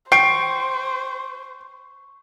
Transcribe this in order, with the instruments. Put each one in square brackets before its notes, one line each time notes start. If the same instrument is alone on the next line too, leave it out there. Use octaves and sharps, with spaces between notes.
[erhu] C5 [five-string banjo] G5 [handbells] C#6 [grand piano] C7 D7